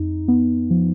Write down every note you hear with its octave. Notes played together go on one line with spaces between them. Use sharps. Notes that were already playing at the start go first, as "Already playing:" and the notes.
Already playing: F2 D#4
B3
F3